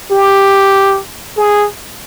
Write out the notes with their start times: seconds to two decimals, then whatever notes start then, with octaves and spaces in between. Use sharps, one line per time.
0.11 G4
1.38 G#4